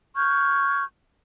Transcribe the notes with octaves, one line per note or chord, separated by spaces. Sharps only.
C#6 F6 G6 G#6